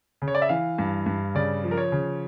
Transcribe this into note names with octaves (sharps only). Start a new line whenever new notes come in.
C#3
C#5
D5
E5
E3 F5
G2
G2
C#3 D5
F3
A#4
C#5
C#3